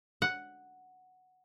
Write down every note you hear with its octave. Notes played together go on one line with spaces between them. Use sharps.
F#5